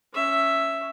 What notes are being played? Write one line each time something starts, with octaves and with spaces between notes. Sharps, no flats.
C#4 E5